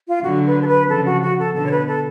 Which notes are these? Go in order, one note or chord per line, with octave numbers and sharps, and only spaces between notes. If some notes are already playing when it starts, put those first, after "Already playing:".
F4
D3 F#3 F#4
B4
A4
B4
C#3 F3 A4
F#4
F#4
A4
B2 D3 A4
C#5
B4
A4